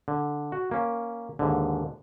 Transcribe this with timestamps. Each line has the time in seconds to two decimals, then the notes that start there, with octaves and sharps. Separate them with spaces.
0.08 D3
0.52 F#4
0.71 A#3 C#4
1.39 D#2 G#2 D3